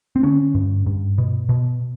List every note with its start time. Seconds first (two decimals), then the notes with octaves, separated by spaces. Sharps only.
0.16 C4
0.23 D3 C#4
0.55 G2
0.86 G2
1.18 B2
1.49 B2